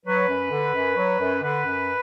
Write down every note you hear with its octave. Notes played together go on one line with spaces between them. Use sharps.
F#3 B4
F#2
D3
F#2
F#3
F#2
D3 B4
F#2